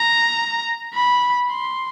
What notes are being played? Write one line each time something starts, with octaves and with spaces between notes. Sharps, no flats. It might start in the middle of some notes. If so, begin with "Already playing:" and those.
Already playing: A#5
B5
C6